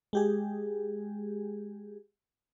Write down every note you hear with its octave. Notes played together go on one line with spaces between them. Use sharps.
G#3 G4 G#4